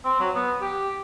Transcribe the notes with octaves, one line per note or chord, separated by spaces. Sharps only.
C4
F#3
B3
G4